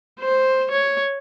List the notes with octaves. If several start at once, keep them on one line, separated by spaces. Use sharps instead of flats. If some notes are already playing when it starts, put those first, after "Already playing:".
C5
C#5